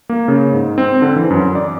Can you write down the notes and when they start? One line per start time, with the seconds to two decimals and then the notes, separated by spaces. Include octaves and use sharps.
0.09 A#3
0.28 C#3
0.52 G#2
0.78 C4
1.02 D3
1.16 E3
1.30 F#2
1.55 D5